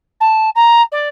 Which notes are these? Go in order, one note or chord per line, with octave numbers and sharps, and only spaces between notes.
A5
A#5
D5